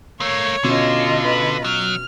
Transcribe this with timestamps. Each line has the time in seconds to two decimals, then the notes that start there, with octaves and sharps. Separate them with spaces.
0.20 A3 A#3 C#5
0.64 B2 D3 C#4 F4 D#5
1.24 B4
1.65 F#3 F6